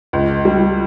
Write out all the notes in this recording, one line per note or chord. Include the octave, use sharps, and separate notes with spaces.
C#2
G3